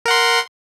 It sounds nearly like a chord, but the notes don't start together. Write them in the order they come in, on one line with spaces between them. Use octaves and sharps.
A#4 F#5 C6